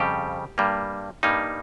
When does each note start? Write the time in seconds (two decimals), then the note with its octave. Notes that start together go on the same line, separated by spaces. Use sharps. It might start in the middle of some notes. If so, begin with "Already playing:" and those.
Already playing: F2 C#3 G3 G4
0.58 G2 G3 A#3
1.23 G2 G3 A#3 D#4